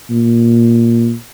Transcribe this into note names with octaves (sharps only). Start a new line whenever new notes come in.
A#2